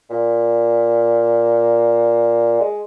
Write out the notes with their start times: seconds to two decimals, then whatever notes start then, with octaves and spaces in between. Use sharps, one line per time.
0.10 A#2
2.60 G#3